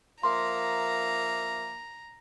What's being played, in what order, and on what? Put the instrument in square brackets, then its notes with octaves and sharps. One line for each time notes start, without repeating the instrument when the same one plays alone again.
[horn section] F3 A#3 E5 [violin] A#5 [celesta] C6